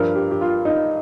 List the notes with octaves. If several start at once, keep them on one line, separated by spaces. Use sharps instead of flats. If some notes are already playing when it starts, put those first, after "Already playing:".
Already playing: G2 F3 A#4
G4
G4
F4
D#4